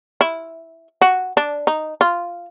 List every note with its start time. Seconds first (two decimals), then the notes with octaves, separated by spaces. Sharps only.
0.21 E4
1.02 F#4
1.37 D4
1.67 D#4
2.01 F4